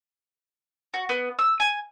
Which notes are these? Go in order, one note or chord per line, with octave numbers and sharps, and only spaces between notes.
F#4
B3
E6
G#5